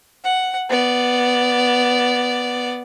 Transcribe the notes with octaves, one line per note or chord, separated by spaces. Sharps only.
F#5
B3 D5